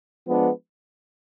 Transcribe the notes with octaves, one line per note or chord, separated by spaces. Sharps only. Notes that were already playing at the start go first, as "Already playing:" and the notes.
F3 G#3 B3 D4